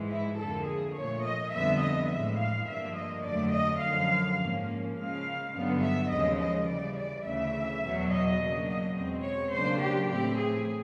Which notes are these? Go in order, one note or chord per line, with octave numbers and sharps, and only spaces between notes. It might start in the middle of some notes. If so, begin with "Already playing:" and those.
Already playing: G#2 E3 G#3
E4
F2 D3 F3 A#3 A4
G#4
A#2 F3 A3 C#5
D#5
F2 D3 G3 B3 E5
D#5
A2 E3 G#3 E5
F5
G2 D3 F3 A#3 D4 E5
D#5
F2 D3 F#3 A3 D5
D#5
F#2 D3 F3 F5
G#2 F3 A#3 C#4
C#3 F3 G#3 F5
G2 D3 F#3 B3
E5
D#2 C#3 F3 G#3 C#4 D#5
D#5
C#3 E3 G3 D5
D5
D2 C#3 E3 E5
E2 B2 F#3
D#5
C#3 F#3 A#3 D4
D#5
E2 B2 G#3 C4
C#5
C#3 F#3 A#3 D4 C5
G4
A2 E3 A3 C4 G4
G#4